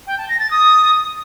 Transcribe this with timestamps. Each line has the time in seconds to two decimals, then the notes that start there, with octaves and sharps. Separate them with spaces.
0.07 G5
0.18 A5
0.29 A#6
0.40 A6
0.51 D#6